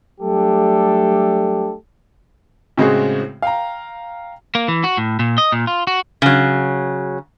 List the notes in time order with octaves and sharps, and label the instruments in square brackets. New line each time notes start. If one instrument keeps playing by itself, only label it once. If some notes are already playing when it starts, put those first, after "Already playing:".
[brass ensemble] F#3 G3 A3 D4 G4 A4
[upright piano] A2 C#3 G#3 C4 F#4 G#4
F5 G5 A#5
[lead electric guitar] A#3
E3
F#4
A2
A#2
D#5
A#2
F4
F#4
[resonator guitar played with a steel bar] C#3 F#3